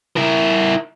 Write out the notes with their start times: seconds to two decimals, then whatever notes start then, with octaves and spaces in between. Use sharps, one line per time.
0.16 E4 A#4